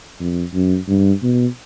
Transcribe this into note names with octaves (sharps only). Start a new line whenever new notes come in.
F2
F#2
G2
B2